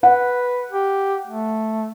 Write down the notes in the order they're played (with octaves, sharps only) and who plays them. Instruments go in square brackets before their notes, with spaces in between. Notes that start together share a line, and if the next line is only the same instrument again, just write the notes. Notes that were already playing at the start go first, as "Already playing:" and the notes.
[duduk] B4 [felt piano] F#5
[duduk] G4
A3